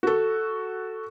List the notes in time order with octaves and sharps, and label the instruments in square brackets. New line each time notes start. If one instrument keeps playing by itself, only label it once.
[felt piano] F#4 A4